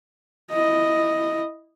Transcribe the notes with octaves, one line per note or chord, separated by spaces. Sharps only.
E4 D#5